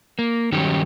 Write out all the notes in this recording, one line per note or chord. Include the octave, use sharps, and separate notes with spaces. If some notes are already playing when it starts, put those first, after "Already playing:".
A#3
G2 D#3 F#3 C#4 D#4 G4